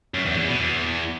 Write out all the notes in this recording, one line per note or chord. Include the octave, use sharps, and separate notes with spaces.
F#2
E2
E2
B2
E2